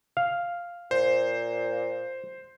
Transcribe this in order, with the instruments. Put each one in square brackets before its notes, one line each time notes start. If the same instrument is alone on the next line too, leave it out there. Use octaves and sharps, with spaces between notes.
[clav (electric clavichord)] F5
[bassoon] A#2 [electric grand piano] C5